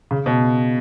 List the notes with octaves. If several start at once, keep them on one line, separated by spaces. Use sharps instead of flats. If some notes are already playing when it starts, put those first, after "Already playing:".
C#3
B2